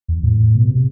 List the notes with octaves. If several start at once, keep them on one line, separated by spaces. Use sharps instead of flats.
E2
A2
B2
C3